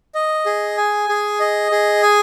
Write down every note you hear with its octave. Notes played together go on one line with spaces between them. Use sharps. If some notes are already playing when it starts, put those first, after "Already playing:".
D#5
G#4
G#5
G#4
D#5
G#4
G#5